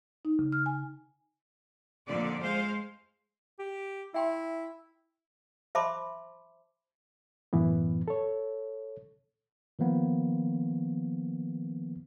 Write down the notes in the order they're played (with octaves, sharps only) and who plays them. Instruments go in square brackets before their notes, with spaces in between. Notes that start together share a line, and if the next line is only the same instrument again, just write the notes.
[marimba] D#4
C#3
F6
G#5
[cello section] F2 A#2 D3 D5
G#3 C5 F5
[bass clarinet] G4
[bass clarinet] E4 [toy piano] E5 G5 C6
[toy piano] C5 E5 A5 B5 C6 D6
[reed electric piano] F#2 A2 E3 B3
A4 C#5
[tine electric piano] D#3 F3 A#3 B3